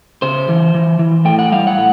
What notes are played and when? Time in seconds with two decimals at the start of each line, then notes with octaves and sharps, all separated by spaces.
0.22 C#3 C5
0.49 E3
0.75 E3
0.99 E3
1.25 A2 G5
1.39 F#5
1.52 G3 F5
1.67 F#5
1.78 A2